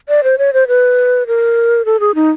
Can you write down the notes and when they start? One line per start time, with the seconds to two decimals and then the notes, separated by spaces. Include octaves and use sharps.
0.09 D5
0.24 C5
0.38 C#5
0.53 C5
0.68 B4
1.27 A#4
1.85 A4
2.00 G#4
2.15 D#4